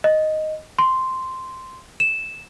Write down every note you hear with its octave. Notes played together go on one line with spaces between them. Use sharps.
D#5
C6
E7